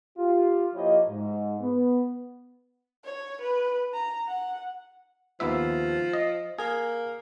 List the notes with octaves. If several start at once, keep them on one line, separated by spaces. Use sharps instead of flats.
F4 G4
F3 A#3 E4 G4 C#5 D#5
G#2
B3
C#5
B4
A#5
F#5
D#2 F3 B3 E5
D#5
A#3 G#4